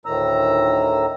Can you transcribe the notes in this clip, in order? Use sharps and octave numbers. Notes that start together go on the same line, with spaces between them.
D2 A2 D#3 A#5 E6